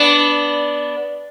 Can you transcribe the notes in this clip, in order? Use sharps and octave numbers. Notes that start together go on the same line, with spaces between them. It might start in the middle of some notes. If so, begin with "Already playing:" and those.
Already playing: B3 D4